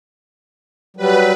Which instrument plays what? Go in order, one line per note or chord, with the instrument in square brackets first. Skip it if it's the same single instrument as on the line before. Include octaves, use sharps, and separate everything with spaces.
[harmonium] F#3 G3 [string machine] B4